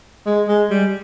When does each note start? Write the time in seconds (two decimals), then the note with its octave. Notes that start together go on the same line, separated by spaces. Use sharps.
0.26 G#3
0.48 G#3
0.70 G3